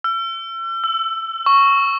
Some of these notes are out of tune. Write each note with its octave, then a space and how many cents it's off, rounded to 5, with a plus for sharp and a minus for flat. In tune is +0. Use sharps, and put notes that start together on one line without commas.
E6 +40
E6 +15
C#6 +0